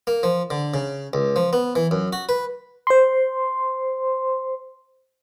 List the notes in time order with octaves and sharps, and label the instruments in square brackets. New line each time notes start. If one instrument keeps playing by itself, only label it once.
[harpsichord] A#3
F3
D3
C#3
C#2
F3
B3
E3
F#2
F#4
B4
[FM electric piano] C5 C6